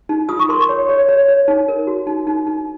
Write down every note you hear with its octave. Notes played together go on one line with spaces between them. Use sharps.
D#4
F4 D#6
C#6
A#4 C6
C#6
C#5
C#5
C#5
C#5
D#4
A#4
F#4
D#4
D#4
D#4